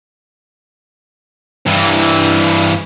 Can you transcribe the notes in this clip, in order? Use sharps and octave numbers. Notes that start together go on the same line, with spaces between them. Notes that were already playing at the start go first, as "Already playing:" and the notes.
G2 E3